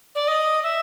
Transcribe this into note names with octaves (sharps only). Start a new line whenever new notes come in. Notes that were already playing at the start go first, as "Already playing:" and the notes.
D5
D#5
E5